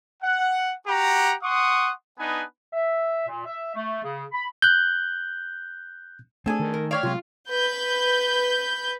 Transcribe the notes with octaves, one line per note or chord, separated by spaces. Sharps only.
F#5
F#4 G4 F#5 A#5
F#5 C6 C#6 D#6
B3 D4 D#4 B4 G#5
E5
A#2
E5
A3
C#3
B5
F#6 G6
A3 C4 D4 G#4 A4 G#5
D#3
A#4
G4 C#5 D5 F5
C3 F#3 G#3 F4
B4 G6